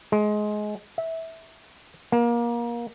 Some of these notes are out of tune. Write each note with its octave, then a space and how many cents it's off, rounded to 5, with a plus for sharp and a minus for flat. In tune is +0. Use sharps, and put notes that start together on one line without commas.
G#3 +20
E5 -15
A#3 +25